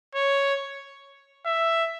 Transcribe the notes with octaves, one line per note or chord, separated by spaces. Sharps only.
C#5
E5